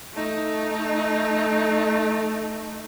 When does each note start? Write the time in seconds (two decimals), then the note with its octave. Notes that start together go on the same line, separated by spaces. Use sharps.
0.14 A3 D#4